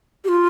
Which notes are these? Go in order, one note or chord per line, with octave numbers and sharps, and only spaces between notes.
G4
F4